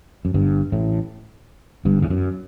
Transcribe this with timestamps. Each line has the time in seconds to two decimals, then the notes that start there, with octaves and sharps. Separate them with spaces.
0.25 F#2
0.34 G1 G2
0.72 A1 A2
1.85 G1 G2
2.02 E2
2.10 F#2